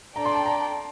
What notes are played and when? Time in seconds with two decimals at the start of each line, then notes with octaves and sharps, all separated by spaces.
0.16 D4 A4 D5 G5 A#5
0.25 C6
0.35 A5
0.46 A#5